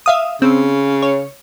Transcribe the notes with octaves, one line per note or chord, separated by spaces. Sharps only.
E5 F5 D#6
C#3 C4
C#5